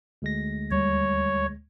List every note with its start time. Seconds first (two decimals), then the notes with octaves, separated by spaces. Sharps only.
0.22 D2 G#3 A#6
0.71 D#2 G3 C#5